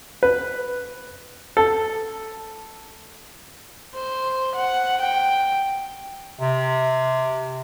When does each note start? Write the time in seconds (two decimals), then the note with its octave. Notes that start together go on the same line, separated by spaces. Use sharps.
0.23 B4
1.57 A4
3.94 C5
4.55 F#5
5.01 G5
6.40 C3